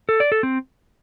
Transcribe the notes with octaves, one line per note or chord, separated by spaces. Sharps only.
A4
D5
A4
C4